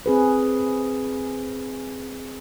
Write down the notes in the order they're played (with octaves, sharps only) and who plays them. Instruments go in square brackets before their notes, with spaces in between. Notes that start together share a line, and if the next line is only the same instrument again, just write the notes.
[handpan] C4 G#4 B4